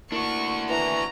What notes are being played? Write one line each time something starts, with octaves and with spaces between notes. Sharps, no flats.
A#3 D4 E4 F#4 A#4 C#6
E3 A#5